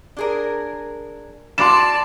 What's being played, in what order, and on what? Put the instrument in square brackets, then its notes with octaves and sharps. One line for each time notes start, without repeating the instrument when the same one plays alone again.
[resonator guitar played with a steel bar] D4 G#4 A#4
[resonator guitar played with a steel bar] E3 F#4 [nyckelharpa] D5 A5 [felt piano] C6 D6 E7